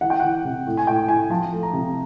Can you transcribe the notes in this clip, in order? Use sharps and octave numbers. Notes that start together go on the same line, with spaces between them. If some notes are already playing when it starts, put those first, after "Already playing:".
E3 F#5
G5
E3 F#5
C3
A2
G#5
A2 G5
A2 G#5
F3 A5
A3
A#5
C3